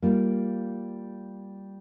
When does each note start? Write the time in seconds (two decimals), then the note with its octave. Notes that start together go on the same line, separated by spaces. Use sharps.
0.02 G3 A#3 F4